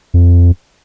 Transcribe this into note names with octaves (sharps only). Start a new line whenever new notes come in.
F2